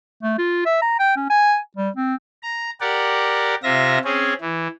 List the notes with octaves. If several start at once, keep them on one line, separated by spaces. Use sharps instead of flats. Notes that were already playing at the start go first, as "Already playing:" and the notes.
A3
F4
E5
A#5
G5
C#4
G#5
G3
C4
A#5
G4 A#4 D5 F#5
C3 F4 E5 A#6
C4 C#4 G#4
E3